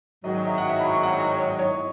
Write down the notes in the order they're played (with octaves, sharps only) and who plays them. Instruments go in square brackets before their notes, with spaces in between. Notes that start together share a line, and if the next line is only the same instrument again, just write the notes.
[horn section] G#2 D#3 F#3 [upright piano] D#5
[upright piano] D#5
E5
F#5
E5
B5
C#6
F#5
D#5
D#5
C#5
D#5
C#5